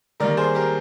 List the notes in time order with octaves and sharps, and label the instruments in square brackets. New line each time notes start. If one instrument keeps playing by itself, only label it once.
[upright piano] D#3 G3 A#3 A#4 D5
A#4
G#4 C5
G4 A#4